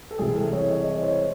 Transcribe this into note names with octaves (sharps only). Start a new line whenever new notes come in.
A4
C2 C3 E3 G#4
A4
C#5
D#5
D#5
C#5
C5
C#5